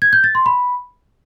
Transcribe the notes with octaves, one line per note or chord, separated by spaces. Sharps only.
G#6
G6
A6
C6
B5